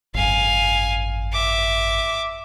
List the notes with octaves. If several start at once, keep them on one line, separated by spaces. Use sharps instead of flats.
G#1 F#2 F5 G#5
E5 D6